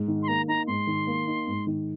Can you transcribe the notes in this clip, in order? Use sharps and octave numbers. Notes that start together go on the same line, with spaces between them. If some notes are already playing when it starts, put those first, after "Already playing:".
Already playing: G#2
D#3
C6
A#3 A#5
D#4 A#5
G#2 C6
D#3
A#3
D#4
G#2
D#3